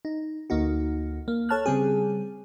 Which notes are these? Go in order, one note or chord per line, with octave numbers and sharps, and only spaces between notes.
D#4
D2 A#3 D#4 F#4
A#3
A4 C#5 A5 F6 F#6
C#3 G3 C4 G#4